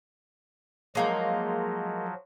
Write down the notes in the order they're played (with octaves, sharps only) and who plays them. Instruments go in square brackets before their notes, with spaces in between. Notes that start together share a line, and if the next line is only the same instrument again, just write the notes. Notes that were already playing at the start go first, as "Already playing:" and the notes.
[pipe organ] F3 F#3 [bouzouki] G#3 A#3 D#4